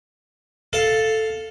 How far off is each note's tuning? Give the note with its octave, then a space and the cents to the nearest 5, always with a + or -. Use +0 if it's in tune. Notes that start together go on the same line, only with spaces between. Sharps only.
A4 +0 F5 +0